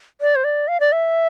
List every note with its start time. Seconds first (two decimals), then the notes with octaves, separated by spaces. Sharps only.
0.21 D5
0.36 C5
0.44 D5
0.68 F5
0.80 D5
0.92 E5